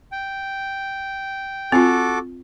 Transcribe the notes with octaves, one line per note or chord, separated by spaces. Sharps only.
G5
C4 F4 F#4 A4 D6